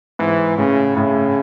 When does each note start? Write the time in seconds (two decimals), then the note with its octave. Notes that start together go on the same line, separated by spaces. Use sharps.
0.19 G#2 E3
0.58 A2 C#3
0.97 A2 C#3